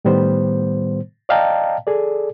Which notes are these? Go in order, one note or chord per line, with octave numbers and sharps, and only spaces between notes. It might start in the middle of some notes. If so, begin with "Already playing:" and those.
A2 D#3 G3 B3 C5
D5 D#5 F5 G5 A5 A#5
G#4 A4 D5